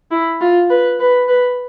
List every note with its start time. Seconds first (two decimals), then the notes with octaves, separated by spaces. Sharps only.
0.11 E4
0.41 F4
0.70 B4
1.00 B4
1.28 B4